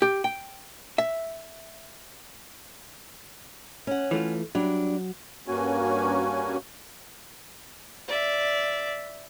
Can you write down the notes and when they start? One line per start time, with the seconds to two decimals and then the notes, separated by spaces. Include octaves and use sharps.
0.02 G4
0.24 G5
0.98 E5
3.87 C#4 F#5
4.11 E3 A3 F4
4.55 F#3 G3 D4
5.48 G2 A#3 C#4 F#4 G#5
8.08 D5 E5